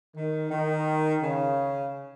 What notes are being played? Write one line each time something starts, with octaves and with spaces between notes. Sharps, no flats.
D#3
D#3
C#3